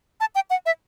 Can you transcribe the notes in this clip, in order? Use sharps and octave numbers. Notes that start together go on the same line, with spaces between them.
A5
G5
F#5
E5